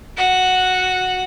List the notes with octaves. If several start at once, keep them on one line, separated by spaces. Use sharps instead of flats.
F#4 F#5